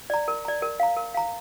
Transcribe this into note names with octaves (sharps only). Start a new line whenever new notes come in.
D5 A#5
A#4
D5 A#5
A#4
F5 A#5
A#4
F5 A#5